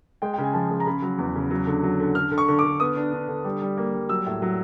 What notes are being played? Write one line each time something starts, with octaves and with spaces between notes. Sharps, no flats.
G#3 G5
C#3 G5
G#5
F3 A5
G#3
A#5
C#3 B5
F#3
E2
C#3
F#3
D3
F#3
D3
D3 F6
D3
C#6
D3
D6
D3
B3 D#6
D4
D4
D3
G3
G3
A#3
G3
F#3 E6
A2
F#3